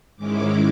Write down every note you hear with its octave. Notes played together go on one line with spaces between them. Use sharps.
G#2 D#3 G#3 C#4 E4 D6